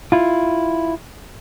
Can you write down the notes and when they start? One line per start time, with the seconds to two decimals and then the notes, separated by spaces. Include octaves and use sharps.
0.12 E4 F4